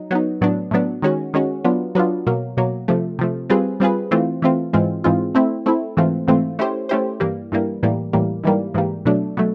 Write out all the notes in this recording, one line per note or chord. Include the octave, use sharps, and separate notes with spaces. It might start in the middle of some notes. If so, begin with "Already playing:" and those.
Already playing: F#3 D#4
F#3 B3 D#4
A2 F#3 B3 D4
A2 F#3 B3 D4
D#3 G#3 C#4 F#4
D#3 G#3 C#4 F#4
F#3 B3 D4 F4
F#3 B3 D4 F4
B2 F#3 A#3
B2 F#3 A#3
C3 F3 A3
C3 F3 A3
G3 C4 F4 G#4 B4
G3 C4 F4 G#4 B4
E3 A3 C4 F4
E3 A3 C4 F4
G#2 E3 G#3 C4 F4
G#2 E3 G#3 C4 F4
A3 C4 E4
A3 C4 E4
G#2 E3 A3 C4 F4
G#2 E3 A3 C4 F4
A3 C#4 E4 G4 C5
A3 C#4 E4 G4 C5
G2 E3 G3 A#3
G2 E3 G3 A#3
A2 E3 G3 A#3
A2 E3 G3 A#3
G#2 E3 G3 A#3
G#2 E3 G3 A#3
B2 F#3 A3 D4
B2 F#3 A3